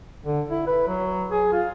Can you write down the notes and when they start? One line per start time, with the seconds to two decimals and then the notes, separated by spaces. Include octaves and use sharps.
0.24 D3
0.51 E4
0.67 B4
0.88 F#3
1.30 G#4
1.52 F4